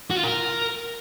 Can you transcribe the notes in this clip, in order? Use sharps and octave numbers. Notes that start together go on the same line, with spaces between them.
F#4
F4
A#4